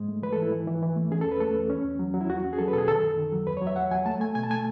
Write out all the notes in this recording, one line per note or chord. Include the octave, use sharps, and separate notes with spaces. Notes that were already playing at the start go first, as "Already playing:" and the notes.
Already playing: G#2 G#3
A3
E3 B4
A4
G#2 E4
E3
E3
E3
A3
C#4 G#4
A4
E2
B4
A3 A4
E2
C#4
E2
F#3
F#3
E4
E2 F#4
C#4
G#4
F#3 A4
B4
B2 A4
G#4
D#3 A4
F#2
D#3
F#3
E2 B4
C#5
F#3
E5
E2 F#5
F#3 G#5
A3 A5
A3 G#5
B2 G#5
A5
A3 G#5